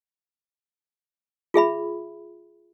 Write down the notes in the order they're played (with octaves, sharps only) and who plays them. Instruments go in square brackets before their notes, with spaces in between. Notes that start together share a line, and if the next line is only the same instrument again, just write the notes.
[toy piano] F4 G#4 E5 B5